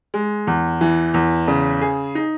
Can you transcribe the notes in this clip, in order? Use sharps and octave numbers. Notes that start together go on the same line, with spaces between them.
G#3
E2
E3
E2
C#3
G#4
D#4